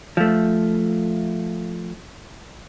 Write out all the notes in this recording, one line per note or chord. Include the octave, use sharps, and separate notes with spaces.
F3 A3